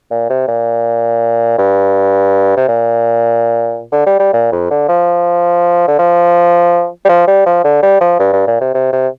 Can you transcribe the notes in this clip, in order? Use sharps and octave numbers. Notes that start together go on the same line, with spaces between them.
A#2
C3
A#2
G2
C3
A#2
D3
G3
G3
A#2
F2
D3
F3
D3
F3
G3
F3
G3
F3
D3
G3
F3
G2
G2
A#2
C3
C3
C3